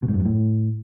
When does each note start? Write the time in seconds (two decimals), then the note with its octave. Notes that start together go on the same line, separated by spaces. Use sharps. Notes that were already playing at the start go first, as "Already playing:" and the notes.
0.03 B2
0.08 G#2
0.14 F#2
0.20 G2
0.25 A2